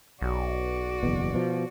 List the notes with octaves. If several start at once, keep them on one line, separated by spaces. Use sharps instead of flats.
B1 F#4 D5
F#1 E2 B2
B2 F3